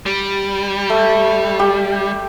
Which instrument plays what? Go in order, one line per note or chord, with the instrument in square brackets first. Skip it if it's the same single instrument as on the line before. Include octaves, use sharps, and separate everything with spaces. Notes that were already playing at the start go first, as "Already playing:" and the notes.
[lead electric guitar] G3
[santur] A3
G4